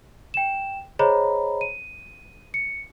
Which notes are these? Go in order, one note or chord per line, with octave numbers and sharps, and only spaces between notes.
G5 E7
G#4 C5 C#5 D#5 A#5 B5
D#7
C#7